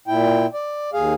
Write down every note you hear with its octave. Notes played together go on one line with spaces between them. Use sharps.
A#2 E4 G5
D5
D#2 G#4 F5